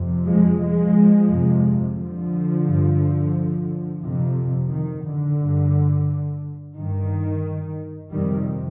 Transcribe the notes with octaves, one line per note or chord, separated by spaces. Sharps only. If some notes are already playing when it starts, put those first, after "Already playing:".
Already playing: F2 C3
F3 G#3
F3 G#3
F2 C3
D3 F3
G2
F2 C3
D#3
D3
G2
G2 D#3
F2 C3 D#3 G3